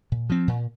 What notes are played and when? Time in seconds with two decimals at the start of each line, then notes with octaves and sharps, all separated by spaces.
0.12 A#2
0.30 F3 C4
0.48 A#2